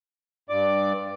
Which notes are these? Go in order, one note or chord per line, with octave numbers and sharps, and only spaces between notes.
G2 D5 D6